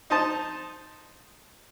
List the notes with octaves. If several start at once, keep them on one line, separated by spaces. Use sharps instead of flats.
D#4 C5 D#5 A5